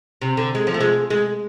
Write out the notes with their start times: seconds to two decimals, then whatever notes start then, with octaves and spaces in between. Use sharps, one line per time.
0.22 C3
0.37 D3
0.55 G#3
0.67 F3
0.74 A3
0.81 G#3
1.10 G#3